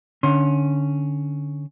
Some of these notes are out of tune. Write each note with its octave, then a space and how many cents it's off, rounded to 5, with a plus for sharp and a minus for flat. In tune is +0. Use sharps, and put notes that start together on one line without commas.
D3 +0 C#4 +0 C6 +30